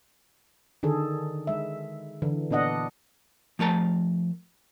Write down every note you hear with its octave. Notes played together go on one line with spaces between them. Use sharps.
D3 D#3 G#4 A4
G#3 E5
D3 E3
A#2 B3 D4 D#5 F#5
F3 A3 A#4 A5